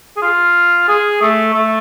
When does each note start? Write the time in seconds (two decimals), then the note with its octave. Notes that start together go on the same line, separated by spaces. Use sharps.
0.17 G#4
0.22 F4
0.88 G#4
1.21 A3
1.53 A3